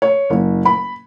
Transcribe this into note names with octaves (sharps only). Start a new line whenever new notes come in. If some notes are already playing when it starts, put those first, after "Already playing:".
C#5
F#1
B5